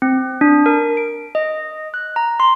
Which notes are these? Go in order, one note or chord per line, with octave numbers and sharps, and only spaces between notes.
C4
D4
A#4
D7
D#5
F#6
A#5
C6